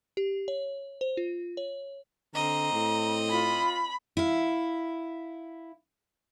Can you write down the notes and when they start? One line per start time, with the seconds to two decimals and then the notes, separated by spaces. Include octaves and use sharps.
0.17 G4
0.48 C#5
1.01 C5
1.17 F4
1.57 C#5
2.35 D3 C4 D#5 A#5
2.73 A2
3.30 F4 B5
4.17 E4 F5